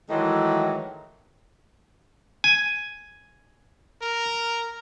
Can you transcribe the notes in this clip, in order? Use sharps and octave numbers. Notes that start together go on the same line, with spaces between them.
D#3 E3 F#3 G#3 A3
G#5
A#4